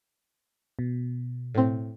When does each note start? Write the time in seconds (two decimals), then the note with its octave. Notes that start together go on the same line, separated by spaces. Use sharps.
0.79 B2
1.55 A2 C4